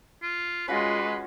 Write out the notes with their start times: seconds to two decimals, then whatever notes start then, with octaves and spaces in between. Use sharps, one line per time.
0.23 F4
0.68 G#3 C#4 F4 F#4 B4 C6